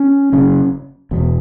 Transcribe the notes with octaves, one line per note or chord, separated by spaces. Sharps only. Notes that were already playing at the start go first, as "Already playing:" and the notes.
Already playing: C#4
F#1 F#2 C#3
E1 E2 B2